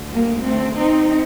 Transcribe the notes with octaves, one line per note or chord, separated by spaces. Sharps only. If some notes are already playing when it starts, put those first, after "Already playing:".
Already playing: D2 D3
G3 A#3
A3 C4
C4 D#4